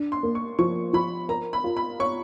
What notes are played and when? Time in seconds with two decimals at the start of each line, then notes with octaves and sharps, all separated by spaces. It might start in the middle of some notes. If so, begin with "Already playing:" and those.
Already playing: D4
0.12 C6
0.23 A#3
0.35 C#6
0.59 F3 C#6
0.93 F3 B5
1.29 A#4 A#5
1.53 B5
1.64 F4
1.77 B5
2.00 C#5 C#6